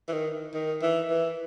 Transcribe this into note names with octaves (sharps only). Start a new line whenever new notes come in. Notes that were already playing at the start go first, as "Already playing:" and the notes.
E3
D#3
D#3
E3
E3